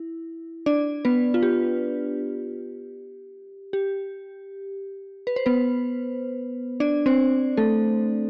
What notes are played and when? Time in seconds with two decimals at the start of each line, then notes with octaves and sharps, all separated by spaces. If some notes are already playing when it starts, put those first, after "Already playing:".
Already playing: E4
0.66 D4 D5
1.05 B3 B4
1.34 F4
1.43 G4
3.73 G4
5.27 B4
5.36 C5
5.46 B3 B4
6.80 D4 D5
7.06 C4 C5
7.57 A3 A4